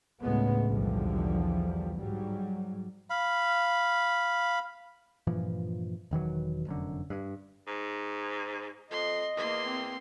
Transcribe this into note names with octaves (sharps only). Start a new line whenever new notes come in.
D2 A2 C#3 G#3 B3
B1 E2 D3 E3 F3 G3
G#2 F#3 G3
F5 B5
G2 A#2 E3 F3
E1 D#3 E3 F#3
F1 F#2 D3
G2
G#2
F2 D#5 C6
E2 A#3 C6
C4